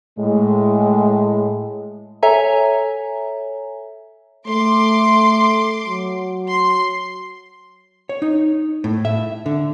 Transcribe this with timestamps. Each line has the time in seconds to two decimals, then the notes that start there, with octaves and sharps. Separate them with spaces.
0.19 A2 G#3
2.23 A4 C#5 E5 G#5 A#5
4.48 A3 C6 D6
5.86 F#3
6.48 C6
8.09 C#5
8.22 D#4
8.84 A2
9.05 E5
9.46 D3